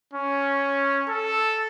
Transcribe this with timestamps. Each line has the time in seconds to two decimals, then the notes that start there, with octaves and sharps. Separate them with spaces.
0.13 C#4
1.09 A4